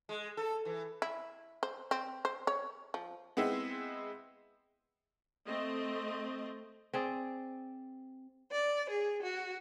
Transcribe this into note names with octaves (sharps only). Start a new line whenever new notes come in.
G#3
A4
E3
E4
C5
C4
C5
C#5
F3
G#3 B3 C4 E4
A3 C4 D#5
C4 G#4 D5
D5
G#4
F#4